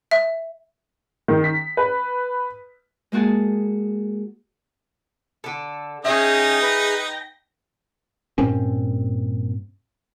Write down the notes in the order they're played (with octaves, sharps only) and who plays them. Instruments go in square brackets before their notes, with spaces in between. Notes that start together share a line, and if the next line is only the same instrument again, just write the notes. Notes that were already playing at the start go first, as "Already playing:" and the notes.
[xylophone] E5
[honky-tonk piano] D#3
B6
B4
[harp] G#3 A#3 F#4 G#4 A5
[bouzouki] D3 A4
[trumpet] C#4 [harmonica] D#4 [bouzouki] G#4 E5 [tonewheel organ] G5 A#6
[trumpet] B4
[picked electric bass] G2 A#2 C4 C#4